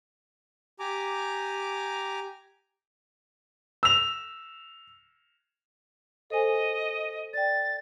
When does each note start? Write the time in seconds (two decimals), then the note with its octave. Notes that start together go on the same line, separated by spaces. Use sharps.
0.80 G4 G#5 A#5 D6
3.83 E6 F7
6.30 A4 C5 D#5 G#5
7.33 D5 G5 A6